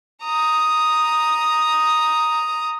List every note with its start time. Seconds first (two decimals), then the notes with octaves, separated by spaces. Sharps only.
0.25 A#5 D#6